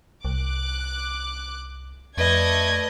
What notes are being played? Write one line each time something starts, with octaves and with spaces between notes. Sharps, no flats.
C2 D6 F#6
F2 A3 B4 D5 D#5 G#6